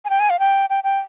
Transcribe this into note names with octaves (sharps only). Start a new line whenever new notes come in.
G#5
G5
G#5
F5
G5
G5
G5